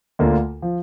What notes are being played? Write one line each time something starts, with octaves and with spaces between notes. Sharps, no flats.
D2 D3 A#3 F4
F3